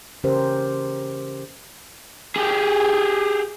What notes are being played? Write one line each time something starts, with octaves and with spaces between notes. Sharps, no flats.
C#3 E3 C#4 G4 A#4 C5
G4 G#4